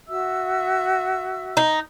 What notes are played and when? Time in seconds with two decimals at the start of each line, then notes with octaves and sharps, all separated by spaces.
0.08 F#4 E5 E6
1.57 D#4